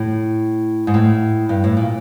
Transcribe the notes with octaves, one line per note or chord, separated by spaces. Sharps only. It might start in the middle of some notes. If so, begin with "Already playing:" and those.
Already playing: A2
G#2
A2
G2
A2
A#2